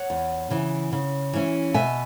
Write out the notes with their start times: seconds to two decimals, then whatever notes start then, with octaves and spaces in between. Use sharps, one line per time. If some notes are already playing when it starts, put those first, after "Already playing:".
Already playing: C#5 F#5
0.10 E2
0.50 C#3 E3
0.92 C#3
1.33 E3 C#4 E4
1.74 B2 E5 G#5